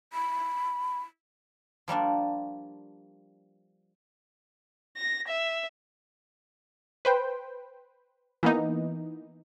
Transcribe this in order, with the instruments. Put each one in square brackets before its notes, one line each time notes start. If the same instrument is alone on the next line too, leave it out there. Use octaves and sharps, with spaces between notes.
[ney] B5
[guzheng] F3 G3 A#3 D4
[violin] A#6
E5
[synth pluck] B4 C5 G5
E3 A#3 B3 D#4